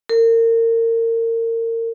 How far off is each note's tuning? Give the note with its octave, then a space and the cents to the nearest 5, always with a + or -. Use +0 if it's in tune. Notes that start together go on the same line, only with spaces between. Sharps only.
A#4 -30